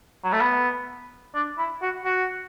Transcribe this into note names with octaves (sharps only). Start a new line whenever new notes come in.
F#3
A3
B3
D4
E4
F#4
F#4